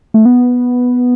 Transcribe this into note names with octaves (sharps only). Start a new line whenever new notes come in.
A3
B3